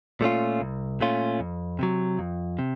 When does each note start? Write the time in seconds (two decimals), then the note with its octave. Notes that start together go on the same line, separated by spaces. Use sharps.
0.21 A#2 A3 C#4 F4
0.61 C2
1.01 A#2 A3 C#4 F4
1.40 F2
1.79 C3 F#3
2.19 F2
2.59 C3